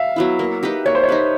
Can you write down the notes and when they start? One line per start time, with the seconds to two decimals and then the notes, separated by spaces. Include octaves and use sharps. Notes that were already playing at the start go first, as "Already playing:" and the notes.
Already playing: E5 F5
0.16 F#3 B3 E4
0.39 A#3
0.63 D#4 G4 B4
0.86 A#3 C#5
0.95 C5
1.04 C#5
1.09 D#4 G4 B4